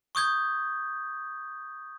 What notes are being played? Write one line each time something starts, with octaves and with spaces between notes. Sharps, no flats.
C#6 D#6 G6 G#6